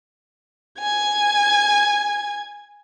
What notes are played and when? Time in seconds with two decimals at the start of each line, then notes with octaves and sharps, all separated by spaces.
0.80 G#5 G#6